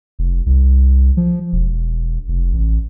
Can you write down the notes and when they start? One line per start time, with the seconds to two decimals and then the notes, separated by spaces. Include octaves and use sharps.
0.19 F1
0.46 C2
1.17 F3
1.53 E1
2.28 F1
2.53 A1